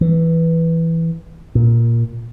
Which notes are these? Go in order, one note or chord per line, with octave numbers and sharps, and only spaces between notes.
E3
A#2